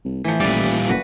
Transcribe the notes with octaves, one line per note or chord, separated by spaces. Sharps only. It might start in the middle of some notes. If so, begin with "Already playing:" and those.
C2
A2 E3 F3
A1 A#2 G3 B4 D5
F#1 F#4 B4